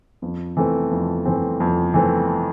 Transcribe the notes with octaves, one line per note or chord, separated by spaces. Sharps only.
F2
E3 A3 C4
F2
E3 A3 C4
F2
E3 A3 C4